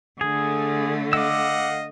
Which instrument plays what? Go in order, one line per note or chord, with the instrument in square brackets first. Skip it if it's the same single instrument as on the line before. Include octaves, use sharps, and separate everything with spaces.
[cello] D3 A3 [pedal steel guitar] G#4
[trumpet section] D#5 F5 F#5 [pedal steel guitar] D6 E6